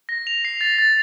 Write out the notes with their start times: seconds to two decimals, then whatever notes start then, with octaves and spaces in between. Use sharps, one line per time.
0.09 A#6
0.27 F7
0.45 C7
0.61 A6
0.79 A6